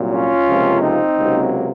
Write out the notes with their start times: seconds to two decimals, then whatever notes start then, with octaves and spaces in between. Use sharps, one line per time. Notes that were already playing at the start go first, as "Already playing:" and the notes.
Already playing: C2 A#2 F#3
0.12 C#4 F4
0.47 C#2 C3 F3 A#3
0.82 C4 D#4
1.17 C#2 C3 F#3 A#3